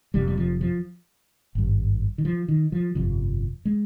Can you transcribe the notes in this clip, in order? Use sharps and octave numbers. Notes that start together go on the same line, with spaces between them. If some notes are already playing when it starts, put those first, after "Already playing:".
F1 F2 C3 G3
G3
F3
F3
G#1 G2
D#3
F3
D#3
F3
G1 F2 C3 F3
G#3